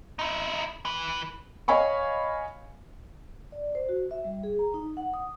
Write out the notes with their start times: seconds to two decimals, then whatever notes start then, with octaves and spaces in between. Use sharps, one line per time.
0.19 D#4 E4
0.85 E3 B4
1.68 C#5 D#5 F5 G#5 B5 C#6
3.52 D5
3.75 C5
3.89 F#4
4.11 E5
4.25 G3
4.43 G#4
4.59 A#5
4.74 D#4
4.97 F#5
5.14 D#6